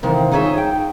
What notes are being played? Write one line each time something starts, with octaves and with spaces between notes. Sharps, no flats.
C3 D#3 E3 C5 F5
D#4 F4 G#4 C#5 D5 E5
G5